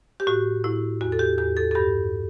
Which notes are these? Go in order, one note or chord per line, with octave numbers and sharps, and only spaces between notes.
G4
A2 F#4
A2 E4
E2 F#4
A4
G4
E2 G4
A4
A4
G2 G4